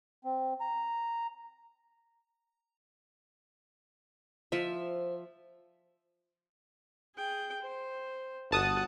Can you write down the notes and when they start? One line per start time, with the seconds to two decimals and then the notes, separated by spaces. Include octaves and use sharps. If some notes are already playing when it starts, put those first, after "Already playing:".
0.24 C4
0.61 A#5
4.52 F3 C5 E5
7.15 G#4 G5
7.62 C5
8.51 G1 F#4 F#5 A5 D#6